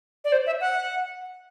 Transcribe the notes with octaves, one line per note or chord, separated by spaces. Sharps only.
D5
C5
E5
F#5